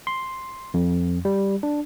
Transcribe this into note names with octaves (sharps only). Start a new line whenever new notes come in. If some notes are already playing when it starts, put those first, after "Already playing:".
C6
F2
G3
D4